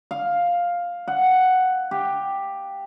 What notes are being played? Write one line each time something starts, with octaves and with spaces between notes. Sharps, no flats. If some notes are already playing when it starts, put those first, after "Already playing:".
F5
F#5
G4